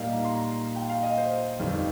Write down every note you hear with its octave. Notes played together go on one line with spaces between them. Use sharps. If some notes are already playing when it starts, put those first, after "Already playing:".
Already playing: A#2 G3 A#3 D#4 F5
A#5
C6
A#5
G5
F5
D#5
C5
G1 F2 D#3 G3